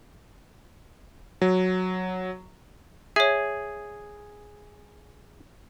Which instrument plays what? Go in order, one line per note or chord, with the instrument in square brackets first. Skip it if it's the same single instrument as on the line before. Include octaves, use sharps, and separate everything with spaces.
[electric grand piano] F#3
[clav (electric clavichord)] G#4 [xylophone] C#5 E5